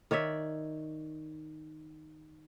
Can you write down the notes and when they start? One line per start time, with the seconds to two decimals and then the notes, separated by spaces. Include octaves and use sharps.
0.11 D#3 C#5 D5 E5